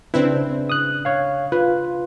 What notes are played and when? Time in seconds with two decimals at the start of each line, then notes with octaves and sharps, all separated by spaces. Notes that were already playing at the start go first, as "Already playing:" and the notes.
0.14 C#3 C4 D4 E4 B4
0.70 D#6 F#6
1.05 C#5 F5
1.52 F4 B4